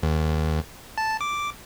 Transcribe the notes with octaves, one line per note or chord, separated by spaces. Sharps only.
D#2
A5
D6